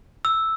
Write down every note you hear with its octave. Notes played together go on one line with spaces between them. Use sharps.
E6